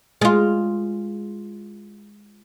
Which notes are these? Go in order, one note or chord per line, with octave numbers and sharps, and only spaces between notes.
G#3 F4